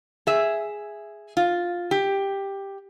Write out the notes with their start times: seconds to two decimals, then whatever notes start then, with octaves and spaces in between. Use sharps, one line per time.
0.27 G#4 E5
1.37 F4
1.91 G4